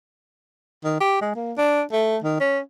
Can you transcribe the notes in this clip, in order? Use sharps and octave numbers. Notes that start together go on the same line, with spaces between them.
D#3
G4
G#3
A#3
D4
A3
D#3
C#4